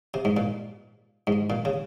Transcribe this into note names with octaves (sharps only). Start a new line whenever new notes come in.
C3
G#2
A#2
G#2
A#2
C#3